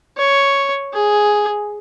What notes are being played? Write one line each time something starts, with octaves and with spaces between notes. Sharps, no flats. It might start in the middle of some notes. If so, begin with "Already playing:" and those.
C#5
G#4